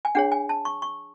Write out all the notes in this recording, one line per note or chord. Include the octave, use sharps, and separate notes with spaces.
G#5
D4 G#4 C#5 F#5
G#5
A5
C#6
C#6